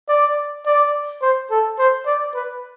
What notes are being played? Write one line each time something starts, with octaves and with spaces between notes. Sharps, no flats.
D5
D5
C5
A4
C5
D5
B4